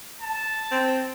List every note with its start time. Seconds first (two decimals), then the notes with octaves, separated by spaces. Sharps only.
0.21 A5
0.71 C4